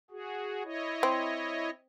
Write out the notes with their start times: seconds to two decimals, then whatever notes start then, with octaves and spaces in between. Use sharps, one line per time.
0.11 F#4 G#4
0.64 E4 C#5 D#5
1.03 C4